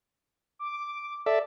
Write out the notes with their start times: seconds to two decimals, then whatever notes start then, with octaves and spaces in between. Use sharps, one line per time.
0.59 D6
1.26 A4 D5 E5